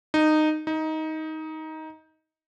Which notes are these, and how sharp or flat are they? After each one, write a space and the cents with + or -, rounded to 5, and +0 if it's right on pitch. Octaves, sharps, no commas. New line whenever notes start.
D#4 -15
D#4 +15